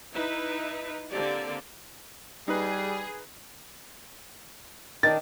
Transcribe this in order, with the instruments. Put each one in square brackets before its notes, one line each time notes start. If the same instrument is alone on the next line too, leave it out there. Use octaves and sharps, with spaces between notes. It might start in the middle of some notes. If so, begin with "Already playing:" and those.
[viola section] D#4 E4 B4
D3 A#3 C4 G4 A4 D5
[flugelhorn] G3 [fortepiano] D#4 B4 [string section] G#4
[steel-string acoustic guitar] D#3 D4 [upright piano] A6